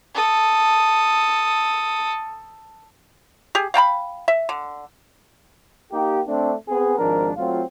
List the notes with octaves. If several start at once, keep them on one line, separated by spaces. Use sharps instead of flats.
A4 D#6
G4 G#4
F5 G5 A5 B5
E5
D3
A#3 D#4 G4
A3 C4 D4
B3 C4 G#4
G#1 F3 G#3 D4 A#4
F#3 A3 C4 F4